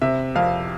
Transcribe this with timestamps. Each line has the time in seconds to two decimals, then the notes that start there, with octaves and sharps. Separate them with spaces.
0.02 C3 E5
0.35 F2 F5